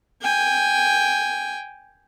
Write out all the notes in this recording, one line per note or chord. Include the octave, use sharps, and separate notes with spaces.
G5 G#5